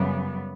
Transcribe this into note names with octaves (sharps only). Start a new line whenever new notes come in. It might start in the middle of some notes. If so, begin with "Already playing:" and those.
Already playing: F#2 C#3 G3 B3